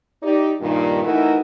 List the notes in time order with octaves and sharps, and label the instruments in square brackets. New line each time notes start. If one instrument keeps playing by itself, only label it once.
[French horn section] D#4 G4 D5
G2 A#2 D#3
E3 A3 D#4 E4 F#4 A#4